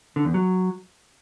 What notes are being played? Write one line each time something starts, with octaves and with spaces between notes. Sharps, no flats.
D3
E2
F#3